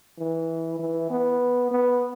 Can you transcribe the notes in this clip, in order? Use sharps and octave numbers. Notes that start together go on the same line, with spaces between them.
E3
E3
B3
B3